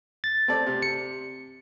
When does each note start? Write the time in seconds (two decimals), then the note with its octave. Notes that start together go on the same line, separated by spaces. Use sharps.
0.24 A6
0.48 C4 A4 D5
0.66 C3
0.82 C#7